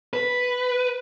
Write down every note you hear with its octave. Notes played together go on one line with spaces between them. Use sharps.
B4